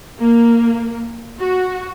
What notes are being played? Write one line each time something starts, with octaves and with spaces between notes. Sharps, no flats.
A#3
F#4